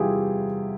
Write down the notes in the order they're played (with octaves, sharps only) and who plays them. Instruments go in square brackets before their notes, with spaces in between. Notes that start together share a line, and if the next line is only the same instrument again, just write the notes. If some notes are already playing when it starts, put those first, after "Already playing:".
Already playing: [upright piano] E2 C3 G3 E4 F4 G4 G#4